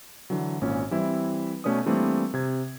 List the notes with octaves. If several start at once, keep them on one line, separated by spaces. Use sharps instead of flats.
D3 E3 F#3
G#1 A#2 C#4
E3 G3 C4 E4
B2 A3 C#4 B4 D5 D#6
E3 G3 A3 A#3 C4 D4
C3 G#6